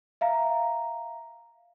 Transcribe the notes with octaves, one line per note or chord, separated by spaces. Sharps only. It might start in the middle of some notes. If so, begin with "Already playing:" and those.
E5 F5 A#5